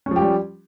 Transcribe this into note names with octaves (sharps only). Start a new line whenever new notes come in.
F3 G3 C#4 G4